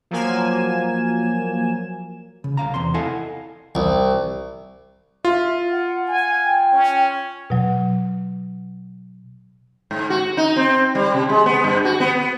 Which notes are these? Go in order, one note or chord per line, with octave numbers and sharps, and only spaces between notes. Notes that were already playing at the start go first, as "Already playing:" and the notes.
F3 F#3 A#3 G#5 E7
C#3
C2 F5 A#5
E2 C3 C6
E4 A4 D#5 F5 F#5 G#5
C2
F4 E5
F#5
G#5
G5
C#4
B2 F#3
G#2
F#4
D#4
C4
G3
C3
G#3
B3
G2
F#4
B3
B3